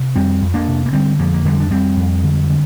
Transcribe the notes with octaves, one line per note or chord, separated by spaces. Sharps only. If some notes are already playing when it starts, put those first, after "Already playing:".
Already playing: C3
F2 G3 C4
F2
A#3 D4
C3
A#3
D3 G3 C4
F2 F3 A#3
A#3
F2 D3 G3
D4
F2 G3 C4
F2
D3
D3